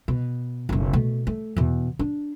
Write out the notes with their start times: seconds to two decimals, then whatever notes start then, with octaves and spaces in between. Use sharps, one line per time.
0.08 B2
0.69 F#1 B1
0.93 B2 A3
1.27 A3
1.57 E2 B2
1.99 D4